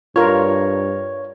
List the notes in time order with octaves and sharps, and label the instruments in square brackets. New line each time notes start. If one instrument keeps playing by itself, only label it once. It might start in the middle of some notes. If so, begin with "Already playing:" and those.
[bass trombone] G2 [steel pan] F4 A#4 [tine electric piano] C#5